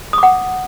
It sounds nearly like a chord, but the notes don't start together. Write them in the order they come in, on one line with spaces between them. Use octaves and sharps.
D#6 D6 F#5